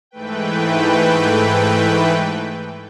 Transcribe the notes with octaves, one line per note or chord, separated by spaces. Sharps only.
G#2 E3 A3 B4 G5